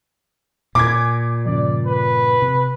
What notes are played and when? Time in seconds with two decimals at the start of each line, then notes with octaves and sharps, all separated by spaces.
0.75 A#2 G#5 D6 G#6
1.46 G2 C#3 F3 D5
1.87 B4
2.42 C3